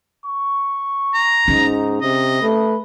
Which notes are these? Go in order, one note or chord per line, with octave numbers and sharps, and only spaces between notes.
C#6
A#5
G#2 C#4 D#4
C3 D#5
A3 B4